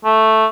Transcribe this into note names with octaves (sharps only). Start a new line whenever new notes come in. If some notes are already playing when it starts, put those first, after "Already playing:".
A3